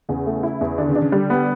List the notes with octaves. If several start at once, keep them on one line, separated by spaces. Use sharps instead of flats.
E2 C#3
A3
E4
E2
D3 D4
C#3
D4
C#3
D3 G3
B3